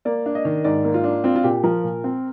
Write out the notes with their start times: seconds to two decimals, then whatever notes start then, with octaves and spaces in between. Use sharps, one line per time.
0.05 A#3 D5
0.26 D4
0.35 D#5
0.45 D#3
0.64 G#2 D5
0.85 A#3
0.94 F4
1.04 D4
1.24 C4 F4
1.36 F4
1.44 A#2 G4
1.64 F3 A#4
1.84 A#2
2.04 C4